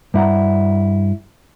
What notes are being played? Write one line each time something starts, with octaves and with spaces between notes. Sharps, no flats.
G2 E4 F#5 A#5